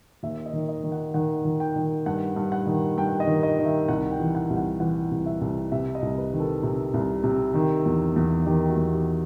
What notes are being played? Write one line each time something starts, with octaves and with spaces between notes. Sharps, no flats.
D#2 E5
D#5
D#3
D#5
D#3
F#5
D#3 F#5
D#3
G5
D#3
G2 F#5
G2
F#5
D#3
G2 G5
D#5
D#3
D#5
D#3
E5
C2 F#5
G5
E3
F#5
C2
F#5
E3 F#5
C2
E5
C2
C3 E5
D#5
C2
B4
D#3
A4
C3
C2
C3
D#3
E2
E2
D#3 G4
F#4
E2
G4